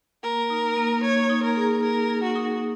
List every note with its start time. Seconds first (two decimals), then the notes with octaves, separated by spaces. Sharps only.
0.23 A#3 A#4
0.50 D#4
0.77 A#3
1.03 A#3 C#5
1.29 D#4
1.43 A#4
1.56 G#4
1.82 G#4 A#4
2.09 G#4
2.23 F#4
2.35 D#4